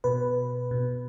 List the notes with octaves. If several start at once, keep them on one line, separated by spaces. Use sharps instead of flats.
B2 B4
B2